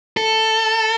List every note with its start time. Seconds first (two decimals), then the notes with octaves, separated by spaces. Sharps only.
0.17 A4